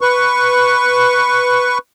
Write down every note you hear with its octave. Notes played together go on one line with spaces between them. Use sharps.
B4 C#6